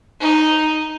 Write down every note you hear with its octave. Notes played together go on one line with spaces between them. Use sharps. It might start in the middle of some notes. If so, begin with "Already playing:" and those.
D#4